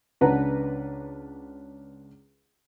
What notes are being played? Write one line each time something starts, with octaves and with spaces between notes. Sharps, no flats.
C#2 D4 B4 F#5 A#5